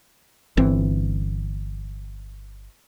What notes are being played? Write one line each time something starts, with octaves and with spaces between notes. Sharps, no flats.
G1 E3 C4